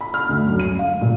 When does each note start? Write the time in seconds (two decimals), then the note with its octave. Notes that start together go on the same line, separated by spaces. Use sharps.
0.01 B5
0.14 F6
0.29 D2
0.47 F#2
0.60 D#7
0.79 F5
1.01 A#2